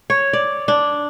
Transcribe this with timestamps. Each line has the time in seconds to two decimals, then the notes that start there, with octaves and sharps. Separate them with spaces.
0.10 C#5
0.33 D5
0.68 D4